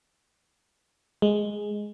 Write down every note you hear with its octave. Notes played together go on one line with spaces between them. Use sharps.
G#3